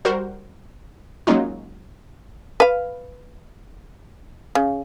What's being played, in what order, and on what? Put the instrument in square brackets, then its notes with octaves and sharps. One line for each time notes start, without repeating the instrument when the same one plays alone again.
[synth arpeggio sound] G3 F#4 A#4 C5
F#3 G#3 A#3 C#4 D#4 F4
[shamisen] B4 F5
C#3